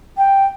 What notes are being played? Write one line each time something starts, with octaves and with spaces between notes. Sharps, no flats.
G5